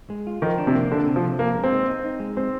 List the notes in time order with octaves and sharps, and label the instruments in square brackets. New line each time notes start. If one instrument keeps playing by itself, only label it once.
[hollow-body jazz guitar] G#3
F4
[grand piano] D#3 [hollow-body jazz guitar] F3
[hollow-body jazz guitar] D4
[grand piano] C3
[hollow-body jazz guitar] A#3
[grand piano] D3 [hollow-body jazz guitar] D4
[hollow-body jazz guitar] C3
[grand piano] F3
[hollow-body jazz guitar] C3
[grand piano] A#3 [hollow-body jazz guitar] A#4
[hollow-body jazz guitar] G#3
[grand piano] C4
[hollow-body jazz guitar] D#4
D#4
D#4
G#3
[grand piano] C4 [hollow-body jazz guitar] C5